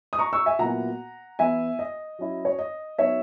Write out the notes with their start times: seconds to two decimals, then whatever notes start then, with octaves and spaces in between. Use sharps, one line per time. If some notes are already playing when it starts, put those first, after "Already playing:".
0.13 D#6
0.19 A#5 C#6
0.33 C#6 E6
0.46 E5 G#5
0.59 A#2 F#3 B3 E4 F#5 A#5
1.39 E3 B3 E4 E5 G#5
1.79 D#5
2.19 F#3 C#4 E4
2.45 C#5
2.59 D#5
2.98 F#3 B3 D#4 C#5 E5